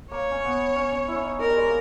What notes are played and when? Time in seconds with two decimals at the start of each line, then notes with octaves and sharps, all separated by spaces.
0.11 A#3 C#5
0.31 C#4
0.44 B3
0.76 C#4
0.92 C#4
1.08 E4
1.15 C#4
1.24 D#4
1.40 D#4 A#4
1.48 G3
1.55 G#3
1.64 A#3